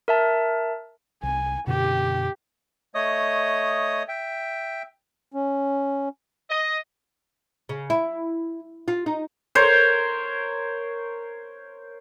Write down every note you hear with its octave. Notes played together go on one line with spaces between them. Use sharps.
A#4 E5 A5
C2 G#5
F#2 B2 D3 G4
A3 C#5 D#5 D#6
E5 G5
C#4
D#5
C#3
E4
F4
D#4
A#4 C5 C#5